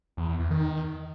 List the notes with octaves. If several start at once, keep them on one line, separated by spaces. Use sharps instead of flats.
E2
E2
E2
D#3